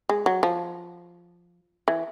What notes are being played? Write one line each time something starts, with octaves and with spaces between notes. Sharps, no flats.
G#3
F#3
F3
E3